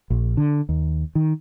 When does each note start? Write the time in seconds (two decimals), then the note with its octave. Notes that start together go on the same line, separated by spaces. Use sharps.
0.10 A#1
0.37 D3
0.69 D#2
1.15 D#3